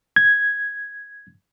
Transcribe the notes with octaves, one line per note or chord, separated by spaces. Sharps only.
G#6